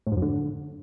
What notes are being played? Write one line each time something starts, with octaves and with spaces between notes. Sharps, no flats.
A2
G#2
F#2
D3